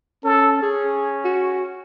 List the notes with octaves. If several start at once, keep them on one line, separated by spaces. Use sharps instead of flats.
C#4 A4
C#4 G#4
F#4